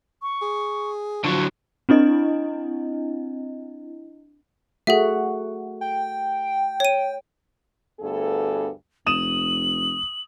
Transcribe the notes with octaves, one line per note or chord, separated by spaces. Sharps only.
C#6
G#4
D3 F3 F#3 C#6
C4 D4 E4 D#5
A3 F#4 G#4 E5
G5
C#5 D#7
D2 G2 B3 G#4 A4
F1 D#6 D#7 E7 F#7